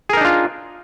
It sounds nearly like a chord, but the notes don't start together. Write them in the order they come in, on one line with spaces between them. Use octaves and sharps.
G#4 A#4 D#4 D4 F4